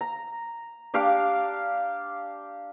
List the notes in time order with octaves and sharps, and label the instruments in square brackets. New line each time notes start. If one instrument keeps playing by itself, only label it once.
[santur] A#5
D4 G4 F5 D6